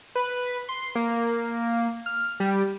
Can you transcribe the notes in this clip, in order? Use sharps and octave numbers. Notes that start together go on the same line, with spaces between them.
B4
C6
A#3
F6
G3